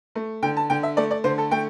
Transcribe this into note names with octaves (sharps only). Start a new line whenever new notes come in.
A3
D3 G5
A5
D3 G5
E5
A3 D5
D5
D3 C5
A4
A3 G5